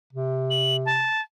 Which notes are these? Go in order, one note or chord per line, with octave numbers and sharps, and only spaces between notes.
C3
F#7
A5